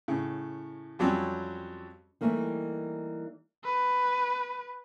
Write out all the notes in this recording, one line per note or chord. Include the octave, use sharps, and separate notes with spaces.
A2 C#3
F2 F#3 G3 C4 C#4
E3 G3 A3 A#3 D#4
B4